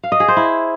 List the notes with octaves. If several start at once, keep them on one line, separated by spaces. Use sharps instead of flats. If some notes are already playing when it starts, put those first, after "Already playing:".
F5
D#5
G#4
C5
E4